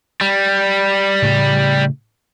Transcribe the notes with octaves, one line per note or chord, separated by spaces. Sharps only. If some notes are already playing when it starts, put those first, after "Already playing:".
G3
A2 C#3 A3